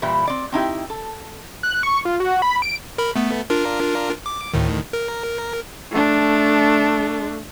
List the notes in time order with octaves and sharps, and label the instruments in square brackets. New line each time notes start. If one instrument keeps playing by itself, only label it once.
[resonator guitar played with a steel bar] A#2 E3 G3 E4
C4 D5
C4 D#4 E4 G4
A4
[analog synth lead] F#6
C#6
F4
F#4
B5
D7
[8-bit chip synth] A#4 B5
A3 B3
D4 F4 A#4
D6
D2 A2 D#3
A#4
[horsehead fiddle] A3 D4